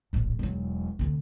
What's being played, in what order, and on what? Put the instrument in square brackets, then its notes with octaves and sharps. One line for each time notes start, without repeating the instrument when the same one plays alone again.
[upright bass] D1 A#1
E1 F#3
D2 C3